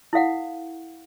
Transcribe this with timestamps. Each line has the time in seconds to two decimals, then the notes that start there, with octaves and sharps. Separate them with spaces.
0.13 E4 A4 F5 F#5